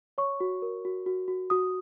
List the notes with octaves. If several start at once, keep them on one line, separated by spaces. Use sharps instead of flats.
C#5 C#6
F#4
A#4
F#4
F#4
F#4
F#4 D#6